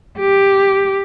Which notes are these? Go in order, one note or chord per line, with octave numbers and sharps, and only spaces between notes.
G4